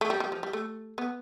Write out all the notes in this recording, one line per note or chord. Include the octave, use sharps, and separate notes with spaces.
A3
G3
G3
F3
G3
A3
B3